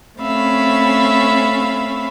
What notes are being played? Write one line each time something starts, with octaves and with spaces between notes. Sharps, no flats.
A3 C4 C#4 E5 F5 B5